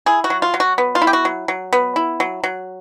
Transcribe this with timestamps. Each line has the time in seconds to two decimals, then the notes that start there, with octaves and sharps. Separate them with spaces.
0.06 E4 G#4
0.24 F#4
0.30 F#3
0.42 F4
0.54 F#3
0.60 F#4
0.78 B3
0.95 F4
1.02 E4
1.07 G4
1.13 F#4
1.25 F#3
1.48 F#3
1.73 B3
1.96 E4
2.20 F#3
2.44 F#3